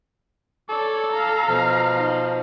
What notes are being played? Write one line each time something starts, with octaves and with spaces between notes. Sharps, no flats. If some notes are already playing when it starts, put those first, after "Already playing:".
A4 C#5 D5
F5 A#5
B2 F3
D#4